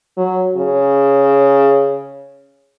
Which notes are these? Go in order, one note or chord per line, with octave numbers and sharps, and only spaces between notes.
F#3
C#3